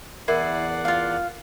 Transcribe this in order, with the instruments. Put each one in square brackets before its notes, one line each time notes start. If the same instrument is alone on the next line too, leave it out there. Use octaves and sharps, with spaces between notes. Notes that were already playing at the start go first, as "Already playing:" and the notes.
[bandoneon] E2 D5 F#5 [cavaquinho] E4 [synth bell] A#4 C7
[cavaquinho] F4 F5